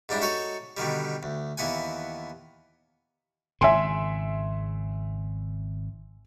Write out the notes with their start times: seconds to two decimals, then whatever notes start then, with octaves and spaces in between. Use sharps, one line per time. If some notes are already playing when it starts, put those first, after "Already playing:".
0.09 G#2 G3 D4 E4
0.22 D#4 F#4 A4 C#5
0.77 B2 D3 D#3 G3
1.23 D2
1.58 D#2 E3 B3 F#5 G#5
3.61 G#1 C#3 E5 G#5 C6